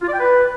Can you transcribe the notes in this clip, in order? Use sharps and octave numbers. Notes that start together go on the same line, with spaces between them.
F4
D5
G5
B4